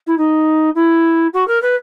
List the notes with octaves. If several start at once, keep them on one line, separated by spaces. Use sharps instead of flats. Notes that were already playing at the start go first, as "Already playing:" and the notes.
E4
D#4
E4
F#4
A#4
B4